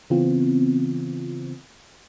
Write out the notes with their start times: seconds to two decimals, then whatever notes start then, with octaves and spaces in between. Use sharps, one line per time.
0.10 C#3 E3 B3 C4 F4